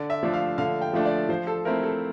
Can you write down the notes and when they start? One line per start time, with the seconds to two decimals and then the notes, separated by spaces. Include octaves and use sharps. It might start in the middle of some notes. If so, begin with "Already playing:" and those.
Already playing: D3 D5
0.10 E5
0.23 F3 A3 D4
0.34 F5
0.58 D3 F5
0.81 G5
0.93 F3 A3 D4
1.05 D5
1.29 F3 C5
1.47 A4
1.65 A3 C4 E4 A#4
1.83 A4